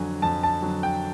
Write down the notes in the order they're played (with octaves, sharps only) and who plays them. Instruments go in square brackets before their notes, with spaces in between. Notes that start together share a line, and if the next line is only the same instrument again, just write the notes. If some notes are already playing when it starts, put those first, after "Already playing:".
Already playing: [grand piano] F2 D3 F#3 G#5
F2 A5
A5
D3 F#3
G5